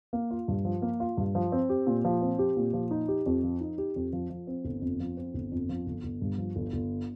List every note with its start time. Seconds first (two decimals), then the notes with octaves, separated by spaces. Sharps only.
0.13 A#3
0.31 F4
0.48 G2
0.65 F3
0.82 A#3
1.00 F4
1.17 G2
1.35 F3
1.52 C4
1.69 G4
1.87 A#2
2.05 F3
2.21 C4
2.39 G4
2.57 A#2
2.73 F3
2.91 D#4
3.08 G4
3.26 F2
3.43 F3
3.61 D#4
3.78 G4
3.96 F2
4.13 F3
4.30 F3
4.47 C4
4.65 G1
4.82 F2
5.00 F3
5.17 C4
5.34 G1
5.52 F2
5.69 F3
5.86 G1
6.04 G1
6.22 G2
6.38 F3
6.56 G1
6.73 G1